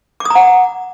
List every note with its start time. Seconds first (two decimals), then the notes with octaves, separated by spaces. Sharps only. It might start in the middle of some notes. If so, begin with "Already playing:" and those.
0.20 D6
0.25 D#6
0.30 A#5
0.35 F#5